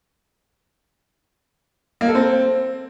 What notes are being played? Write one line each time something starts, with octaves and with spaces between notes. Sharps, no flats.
A#3
A4
C4